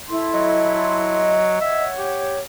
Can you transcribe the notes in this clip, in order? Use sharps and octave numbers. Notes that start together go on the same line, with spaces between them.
E4 A4 C6
F#3 D#5
C#5 E5 F#5
G4